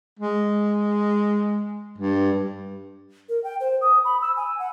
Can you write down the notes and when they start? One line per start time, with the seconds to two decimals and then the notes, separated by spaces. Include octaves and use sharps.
0.19 G#3
1.98 G2
3.29 A#4
3.44 G5
3.60 C5
3.81 D#6
4.04 B5
4.21 E6
4.36 G#5
4.59 F#5